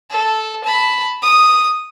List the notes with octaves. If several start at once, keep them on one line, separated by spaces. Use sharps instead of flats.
A4
A5 B5
D#6